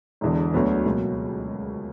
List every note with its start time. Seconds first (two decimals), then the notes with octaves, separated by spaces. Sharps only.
0.21 E1 E2 D3
0.54 D2 D3 F#3 B3
0.85 C#2 B2 F#3 A#3